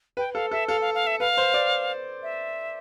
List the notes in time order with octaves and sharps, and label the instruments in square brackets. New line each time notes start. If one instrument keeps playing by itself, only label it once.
[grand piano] B4 [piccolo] G5
[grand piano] A4 [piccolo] F5
[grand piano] A4 [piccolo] E5
[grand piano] A4 [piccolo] F5
[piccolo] F5
F5
E5
[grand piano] B4 [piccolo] F5
[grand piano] C5
D5
[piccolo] E5